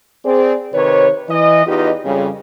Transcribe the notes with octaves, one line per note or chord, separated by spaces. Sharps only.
C4 G#4 D5
C3 D#3 B4 C#5
E3 D#5
E2 D#4 F4 G4 B4 D#5
F2 C#3 G3